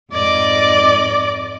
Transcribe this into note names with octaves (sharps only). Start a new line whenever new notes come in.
F2 G#2 D5 D#5 D6